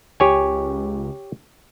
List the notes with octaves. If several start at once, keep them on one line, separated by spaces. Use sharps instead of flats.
C#2 G4 C#5 G#5